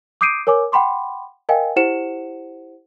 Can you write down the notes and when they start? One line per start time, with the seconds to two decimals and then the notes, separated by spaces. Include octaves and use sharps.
0.21 D6 D#6 G6 C7 D7 D#7
0.47 A#4 C#5 G#5 D6
0.72 F#5 G5 B5 C6 D6
1.49 A#4 D#5 F5 G5 G#5
1.76 E4 G4 C5 F#5 C#7 E7